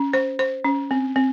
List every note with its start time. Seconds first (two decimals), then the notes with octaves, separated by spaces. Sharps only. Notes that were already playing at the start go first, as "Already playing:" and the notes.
Already playing: C#4
0.13 C5
0.39 C5
0.64 C#4
0.91 C4
1.16 C4